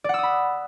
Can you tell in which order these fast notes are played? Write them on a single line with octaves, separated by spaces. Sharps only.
D5 F#5 E6 D#6 B5